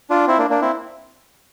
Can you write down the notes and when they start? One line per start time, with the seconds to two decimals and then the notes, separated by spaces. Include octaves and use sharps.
0.10 D4 F4
0.27 C4 E4
0.38 A#3 D4
0.50 A#3 D4
0.61 C4 E4